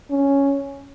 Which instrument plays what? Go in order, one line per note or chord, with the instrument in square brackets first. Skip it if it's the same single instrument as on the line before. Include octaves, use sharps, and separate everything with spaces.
[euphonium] C#4